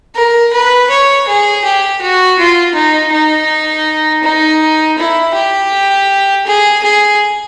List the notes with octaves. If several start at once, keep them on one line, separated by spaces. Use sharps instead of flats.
A#4
B4
C#5
G#4
G4
F#4
F4
D#4
D#4
D#4
E4
G4
G#4
G#4